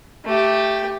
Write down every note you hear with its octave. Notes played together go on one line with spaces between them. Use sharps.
A3 G4